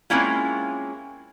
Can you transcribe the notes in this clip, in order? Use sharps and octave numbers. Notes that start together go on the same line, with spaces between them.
G#3 A#3 C4 C#4 E4 F4